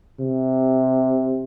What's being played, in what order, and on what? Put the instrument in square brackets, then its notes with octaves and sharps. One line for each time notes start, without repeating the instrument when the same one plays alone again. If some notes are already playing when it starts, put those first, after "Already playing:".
[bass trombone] C3